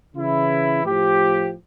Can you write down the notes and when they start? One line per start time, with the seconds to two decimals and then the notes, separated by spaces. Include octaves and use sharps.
0.16 C#3 E3 E4
0.85 A2 F3 G4